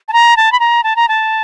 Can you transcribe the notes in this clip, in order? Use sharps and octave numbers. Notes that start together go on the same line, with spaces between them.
A5
A#5
A5
B5
A#5
A5
A#5
A5